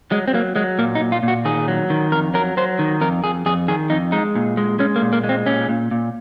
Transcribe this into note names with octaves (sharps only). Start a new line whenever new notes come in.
F#3 G#3
C4
F#3 A#3
F#3 G#3
A#2 A#3
D#4
A#2
F4
A#2
F#4
D#3 G#4
F#3
D#3
F2 A#4
F#3 A#4
F#3 C5
D#3
F2 A#4
F2 G#4
F2 G#4
D#3 G#4
F2 D#4
G#3 D#4
A#2
G#3
G#3 C#4
A#3
A#2
A#3
G#3
C4
A#2 C#4
A#2
A#2